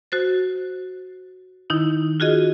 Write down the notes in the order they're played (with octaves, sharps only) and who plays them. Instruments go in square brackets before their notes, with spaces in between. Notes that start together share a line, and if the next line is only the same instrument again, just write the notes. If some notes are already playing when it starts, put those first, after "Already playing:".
[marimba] F#4 C5 A6
D#3 D#4 E4
F4 F#4 G#4 D#5